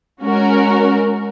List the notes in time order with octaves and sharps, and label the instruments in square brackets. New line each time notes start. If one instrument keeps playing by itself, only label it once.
[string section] G#3 C#4 F#4 A#4